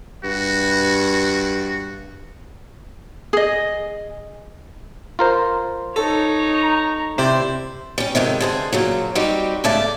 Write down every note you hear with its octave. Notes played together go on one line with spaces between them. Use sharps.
G2 F#4
G#4 D#5
F4 A#4 C5
D#4 A4 C#5
A#5
C3 E4 C5 D5 G5
G3 C#4
F2 G#2 C3 D#3
D3 G#4 C5
A#2 C#3 F#3
G3 C4 D#4 F#4 G4
G#2 C#3 A3 D5 A5